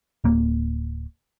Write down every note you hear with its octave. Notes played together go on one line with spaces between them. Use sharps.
D1 A#3